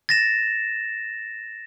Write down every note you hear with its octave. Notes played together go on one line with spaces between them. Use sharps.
A6 A#6 E7